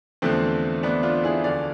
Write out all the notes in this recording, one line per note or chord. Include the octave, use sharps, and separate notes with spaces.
E2 D3 F3 A3 C4
B3 D4
D4 F4
E4 G#4
D2 D3 F3 D5 F5